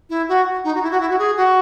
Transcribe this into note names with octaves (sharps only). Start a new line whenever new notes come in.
E4
F#4
D#4
F#4
E4
F#4
E4
F#4
G#4
F#4